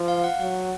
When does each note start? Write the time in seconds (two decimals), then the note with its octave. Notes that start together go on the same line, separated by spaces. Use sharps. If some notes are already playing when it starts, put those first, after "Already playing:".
Already playing: F3
0.08 F5
0.24 F#5
0.40 F#3 F#5